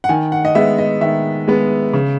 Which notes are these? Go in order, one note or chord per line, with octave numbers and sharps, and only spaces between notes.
F#5
D#3 G#5
F#5
D#5
G#3 B3 E5
D#5
D#3 E5
G#3 B3
C#3